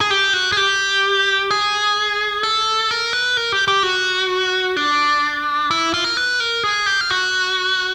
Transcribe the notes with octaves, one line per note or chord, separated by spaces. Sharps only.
G#4
G4
F#4
G#4
G4
G#4
A4
A#4
B4
A#4
G4
G4
F#4
D4
E4
F4
A#4
B4
A#4
G#4
G4
F4
F#4